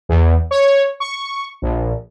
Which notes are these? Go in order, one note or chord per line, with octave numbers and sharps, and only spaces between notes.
E2
C#5
C#6
A#1